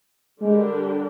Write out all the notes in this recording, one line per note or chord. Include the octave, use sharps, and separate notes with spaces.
D3 G3 G#3 D4 G4 A#4